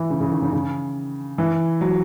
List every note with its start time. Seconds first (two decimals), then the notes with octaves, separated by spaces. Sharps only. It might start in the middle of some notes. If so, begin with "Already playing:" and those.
Already playing: E3
0.10 C#3
0.21 C#3
0.32 D#3
0.42 C#3
0.53 C#3
1.38 E3
1.81 F#3